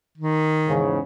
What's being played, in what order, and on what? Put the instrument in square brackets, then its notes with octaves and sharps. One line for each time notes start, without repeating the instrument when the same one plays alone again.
[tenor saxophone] D#3
[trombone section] E2 G#2 C#3